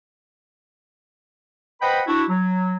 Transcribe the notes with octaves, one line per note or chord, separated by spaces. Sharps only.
B4 C5 D#5 F#5 G5 B5
D4 E4 F#4
F#3